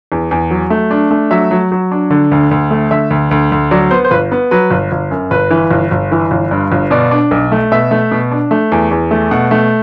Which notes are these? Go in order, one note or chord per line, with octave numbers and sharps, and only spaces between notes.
E2
E2
F#3
A3
D4
A3
F#3 E5
F#3
F#3
D4
D3
D2
D2
A3
D3 E5
D2
D2
D2
F#3 D5
B3 C5
C5
G1 B4
B3
F#3 B4
G1
G1
F#2
G1 B4
E3
G1
G1
E3
G1
G2
G1
B2 D5
D4
B1
A3
B2 E5
A3
B2
D4
A3
E2
E2
A3
B2 F#5
A3